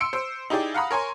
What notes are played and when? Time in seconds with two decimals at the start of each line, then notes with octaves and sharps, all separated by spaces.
0.01 C6 E6 C#7 D7
0.13 C5 E6
0.50 D#4 E4 G4 G#4 D5
0.74 F5 F#5 A#5 B5 D#6
0.91 A#4 C#5 G#5 C6 C#6